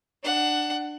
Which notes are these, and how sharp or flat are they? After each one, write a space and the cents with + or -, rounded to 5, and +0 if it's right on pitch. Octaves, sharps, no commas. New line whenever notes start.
D4 +20 F#5 +15